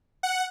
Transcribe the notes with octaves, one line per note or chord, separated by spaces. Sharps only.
F#5